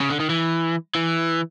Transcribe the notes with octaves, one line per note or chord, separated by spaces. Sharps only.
C#3
D3
D#3
E3
E3